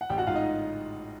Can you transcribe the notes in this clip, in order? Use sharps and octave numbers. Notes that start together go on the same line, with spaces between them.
F#5
A1 G4 G5
F#4 F#5
G#2 F4 F5
D#4 D#5